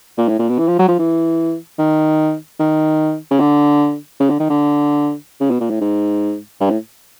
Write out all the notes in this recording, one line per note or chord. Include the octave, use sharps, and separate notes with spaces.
A#2
A2
A#2
B2
E3
F3
F#3
F3
E3
D#3
D#3
C#3
D3
C#3
D3
D#3
D3
C#3
B2
A#2
A2
G#2
G2
A2